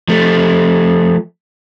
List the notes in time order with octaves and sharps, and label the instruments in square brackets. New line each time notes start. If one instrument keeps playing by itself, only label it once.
[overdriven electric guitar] F3 A3